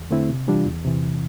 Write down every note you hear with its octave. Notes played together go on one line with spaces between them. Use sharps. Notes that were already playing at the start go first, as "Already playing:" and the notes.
Already playing: E2
D3 A3 C4 E4
C3
E3 G3 D4 F4
E2
C3 E3